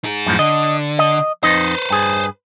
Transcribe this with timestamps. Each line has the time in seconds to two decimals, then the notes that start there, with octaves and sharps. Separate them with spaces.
0.04 D#4 G#4
0.27 F#2 A2 F3
0.39 D3 D#5
0.99 D#5
1.43 F2 D#4 B4 C5 D#5
1.90 G2 G#4